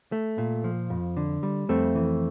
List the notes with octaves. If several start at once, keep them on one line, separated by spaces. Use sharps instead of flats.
A3
A#2
F3
F2
D3
G3
F2 A3 C4
E3